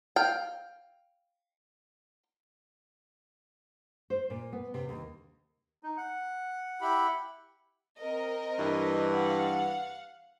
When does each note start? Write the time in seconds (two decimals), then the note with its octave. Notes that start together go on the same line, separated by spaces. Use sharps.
0.16 F5 G5
4.10 C5
4.30 A#2
4.52 B3
4.74 C3
4.89 D#2
5.83 D#4
5.98 F#5
6.81 E4 G4 B5
7.99 C4 A#4 D#5
8.57 G2 E3
9.13 F5 F#5